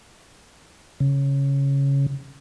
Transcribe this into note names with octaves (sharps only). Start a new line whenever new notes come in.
C#3